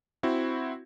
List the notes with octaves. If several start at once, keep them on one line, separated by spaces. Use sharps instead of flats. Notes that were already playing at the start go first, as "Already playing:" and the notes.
C4 E4 F#4